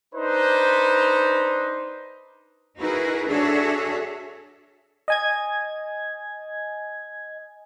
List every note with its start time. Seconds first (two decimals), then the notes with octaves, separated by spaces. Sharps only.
0.14 D4 D#4 B4 C5
2.78 D#4 E4 F#4 G#4 A#4 B4
3.28 D4 F#4 G#4 A4 C#5 E5
5.08 D#5 G#5 G#6